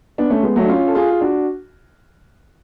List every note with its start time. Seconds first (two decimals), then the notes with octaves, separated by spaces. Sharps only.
0.18 B3 D4
0.30 A3 C#4
0.43 G#3 B3
0.56 F#3 A3
0.65 D4
0.69 C#4 F4
0.87 A4
0.95 F4 G#4
1.11 G#4
1.21 D4 F#4